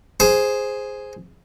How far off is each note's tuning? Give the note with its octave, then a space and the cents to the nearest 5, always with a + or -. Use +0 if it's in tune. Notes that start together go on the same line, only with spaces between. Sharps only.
G#4 +0 C5 +0